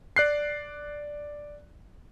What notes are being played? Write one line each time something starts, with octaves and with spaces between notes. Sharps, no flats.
D5 F#6 C7